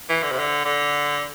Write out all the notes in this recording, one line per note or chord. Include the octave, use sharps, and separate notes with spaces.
E3
D3
C3
D3
D3